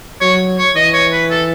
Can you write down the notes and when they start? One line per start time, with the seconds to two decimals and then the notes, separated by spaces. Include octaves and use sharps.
0.21 F#3 C#5
0.58 C#5
0.76 E3 D#5
0.93 C#5
1.12 B4
1.30 A4